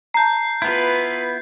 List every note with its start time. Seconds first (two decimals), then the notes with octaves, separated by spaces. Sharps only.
0.14 A5 A#5 G6 C7
0.62 B3 E4 F4 B4